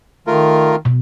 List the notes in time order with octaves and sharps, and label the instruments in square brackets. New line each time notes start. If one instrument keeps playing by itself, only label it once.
[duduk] D#3 [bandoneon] A3 F4 A#4
[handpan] B2